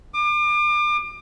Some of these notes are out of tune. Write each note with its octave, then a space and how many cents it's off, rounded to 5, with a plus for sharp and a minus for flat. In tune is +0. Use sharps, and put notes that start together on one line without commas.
D6 +35